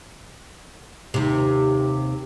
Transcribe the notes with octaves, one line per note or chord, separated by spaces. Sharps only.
D#2 C3